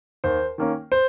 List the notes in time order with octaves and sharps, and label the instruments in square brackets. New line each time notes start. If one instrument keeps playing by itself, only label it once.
[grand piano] D#2 C5
D#3 A#3 C#4
C5